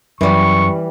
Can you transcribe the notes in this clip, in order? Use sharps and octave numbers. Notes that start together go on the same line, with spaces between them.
F#2 E3 G3 C#6